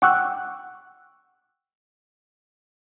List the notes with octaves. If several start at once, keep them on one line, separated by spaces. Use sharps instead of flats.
F#5 G5 C#6 D6 E6 F#6